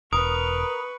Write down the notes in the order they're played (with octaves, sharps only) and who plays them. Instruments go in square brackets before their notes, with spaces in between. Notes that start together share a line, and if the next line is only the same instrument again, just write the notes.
[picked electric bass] E1 [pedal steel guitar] A#4 [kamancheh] B4 C#6 [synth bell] D#6